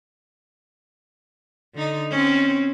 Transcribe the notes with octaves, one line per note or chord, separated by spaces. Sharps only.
D3 D#4
C4 C#4